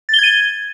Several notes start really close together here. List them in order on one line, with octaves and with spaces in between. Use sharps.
A6 G7 G#6 D#7